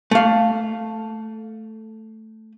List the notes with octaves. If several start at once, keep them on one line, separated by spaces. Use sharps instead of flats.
A3 F5